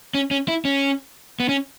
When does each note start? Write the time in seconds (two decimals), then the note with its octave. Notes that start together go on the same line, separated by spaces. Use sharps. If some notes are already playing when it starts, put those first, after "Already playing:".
0.15 C#4
0.31 C#4
0.48 E4
0.65 C#4
1.40 B3
1.49 C#4